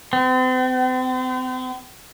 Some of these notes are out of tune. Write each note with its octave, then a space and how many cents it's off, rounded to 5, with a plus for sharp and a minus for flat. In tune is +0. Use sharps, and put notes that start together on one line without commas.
C4 -40